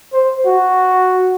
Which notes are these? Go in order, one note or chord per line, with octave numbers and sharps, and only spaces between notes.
C5
F#4